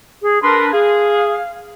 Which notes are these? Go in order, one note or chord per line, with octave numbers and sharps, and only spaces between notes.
G#4
D4 A#4 B4 C6
G#4 F5